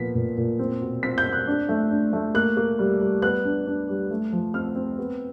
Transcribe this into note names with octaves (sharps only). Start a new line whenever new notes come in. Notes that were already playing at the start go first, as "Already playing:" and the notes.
Already playing: A#2 F3 B3 B6
A#2
A#2
C4
B2
C4 B6
G6
C4
F#6
D4
A3
D4
A3
A#3 F#6
A#3
G3
G3
B3 F#6
D4
D4
G3
A3
F3
C4 F6
C4
B3